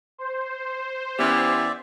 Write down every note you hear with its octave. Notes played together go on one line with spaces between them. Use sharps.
C5
E3 B3 C#4 G4 D5 E5 F6